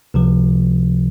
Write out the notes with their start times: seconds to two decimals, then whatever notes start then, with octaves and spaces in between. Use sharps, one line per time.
0.14 C#2 C3 F3